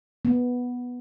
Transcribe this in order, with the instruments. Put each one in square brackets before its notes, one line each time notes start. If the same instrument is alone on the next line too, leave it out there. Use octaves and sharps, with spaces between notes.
[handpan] B3